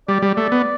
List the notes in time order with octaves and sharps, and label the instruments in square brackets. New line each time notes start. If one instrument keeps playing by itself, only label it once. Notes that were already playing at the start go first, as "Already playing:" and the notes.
[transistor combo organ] G3 [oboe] D5
[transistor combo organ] G3
[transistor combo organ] A3 [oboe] D5
[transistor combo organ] B3